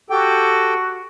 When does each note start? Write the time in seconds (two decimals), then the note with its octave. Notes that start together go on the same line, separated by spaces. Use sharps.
0.10 F#4 G4 A4 G5